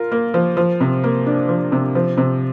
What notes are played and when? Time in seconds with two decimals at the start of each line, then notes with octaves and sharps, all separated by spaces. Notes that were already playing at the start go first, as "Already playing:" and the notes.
Already playing: F4 A#4
0.12 A#3
0.34 F3
0.57 F3
0.80 C3
1.04 A#3
1.26 D4
1.49 F3
1.72 C3
1.95 F3
2.17 C3